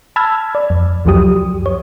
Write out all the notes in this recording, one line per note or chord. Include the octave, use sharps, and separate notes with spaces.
A5 B5 E6 F6 G#6
D5
F2
C#2 F#2 F3 F#3 G4 D#6
C#5